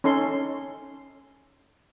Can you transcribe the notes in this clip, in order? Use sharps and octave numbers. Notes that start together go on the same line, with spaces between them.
C#4 D#4 A4 C6